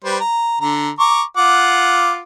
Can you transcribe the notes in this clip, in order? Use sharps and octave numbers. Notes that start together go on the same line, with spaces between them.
G3 B4 C5
A#5
D3 A#5
A#5 C#6 D6
F4 F#5 D6